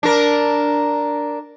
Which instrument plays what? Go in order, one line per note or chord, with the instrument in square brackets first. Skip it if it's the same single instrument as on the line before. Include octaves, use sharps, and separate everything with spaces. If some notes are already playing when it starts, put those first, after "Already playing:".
[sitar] D4 A#4